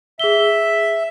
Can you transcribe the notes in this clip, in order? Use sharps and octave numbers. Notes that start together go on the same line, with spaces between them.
G#4 E5 G7